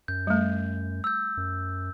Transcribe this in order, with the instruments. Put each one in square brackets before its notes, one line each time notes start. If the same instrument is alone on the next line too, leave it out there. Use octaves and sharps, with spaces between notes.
[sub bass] F#2 [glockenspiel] G6
[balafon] G3 A3
[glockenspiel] E6 G6
[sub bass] F#2